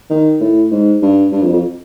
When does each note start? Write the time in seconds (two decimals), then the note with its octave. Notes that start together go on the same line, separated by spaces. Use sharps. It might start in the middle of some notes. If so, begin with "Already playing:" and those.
0.10 D#3
0.40 A2
0.71 G#2
1.02 G2
1.32 G2
1.42 F2
1.53 F2